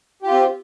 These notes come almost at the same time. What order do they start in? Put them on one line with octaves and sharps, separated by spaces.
G4 F4 C4